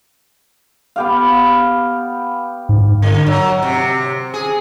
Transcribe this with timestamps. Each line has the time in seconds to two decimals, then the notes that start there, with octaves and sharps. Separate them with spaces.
0.96 B3 G4 F5
2.69 G#2
3.02 D3
3.26 F#3
3.62 C3
4.34 G#4